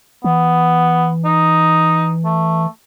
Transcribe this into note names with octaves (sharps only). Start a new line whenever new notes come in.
E3 B3
D#4
A3